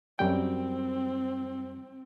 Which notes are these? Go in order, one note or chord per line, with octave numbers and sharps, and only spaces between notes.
F#2 G3 C4 G5